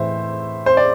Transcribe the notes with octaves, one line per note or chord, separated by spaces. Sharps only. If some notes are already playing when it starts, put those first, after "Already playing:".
Already playing: A2 E3 C5 E5
C5
D5